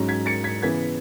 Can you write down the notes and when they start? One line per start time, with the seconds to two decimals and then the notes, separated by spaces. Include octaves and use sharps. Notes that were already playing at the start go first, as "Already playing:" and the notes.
Already playing: G#2 F#3 C#4
0.08 G#6 B6
0.26 A6 C#7
0.44 G#6 B6
0.62 C#3 E3 B3 G#6 B6